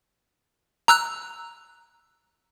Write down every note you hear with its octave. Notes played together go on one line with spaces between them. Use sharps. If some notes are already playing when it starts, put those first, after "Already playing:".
A#5 E6 F#6